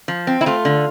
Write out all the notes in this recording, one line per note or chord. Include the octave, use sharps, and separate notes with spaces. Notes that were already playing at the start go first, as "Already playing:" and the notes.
F3
C4
E4
A3 F4
D3